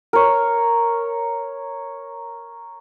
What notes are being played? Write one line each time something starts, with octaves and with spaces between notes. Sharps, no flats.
A#4 C#5